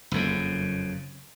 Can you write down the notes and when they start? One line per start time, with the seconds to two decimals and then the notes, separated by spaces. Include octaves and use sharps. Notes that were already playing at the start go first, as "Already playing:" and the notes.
0.11 F#1 F2 C#3